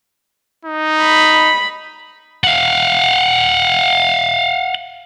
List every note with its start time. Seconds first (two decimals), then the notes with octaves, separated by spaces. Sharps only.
0.65 D#4
1.01 B5
2.44 F5 F#5